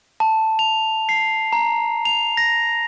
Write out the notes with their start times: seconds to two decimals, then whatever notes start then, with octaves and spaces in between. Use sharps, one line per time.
0.20 A5
0.59 F7
1.09 C7
1.53 A#5
2.05 F7
2.37 A#6